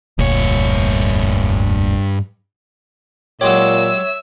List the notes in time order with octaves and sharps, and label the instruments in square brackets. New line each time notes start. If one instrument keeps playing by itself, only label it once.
[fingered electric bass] F1 D2 A#2 [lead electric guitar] G2 C#5
[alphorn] A#2 [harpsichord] F#3 G#3 G4 [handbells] C#5 [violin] E5 E6